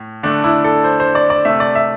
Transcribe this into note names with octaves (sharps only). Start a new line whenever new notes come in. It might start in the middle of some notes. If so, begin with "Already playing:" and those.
Already playing: A2
D3 A3 D4
E4
A4
C5
C5
D5
D5
C3 A3 E5
D5
E5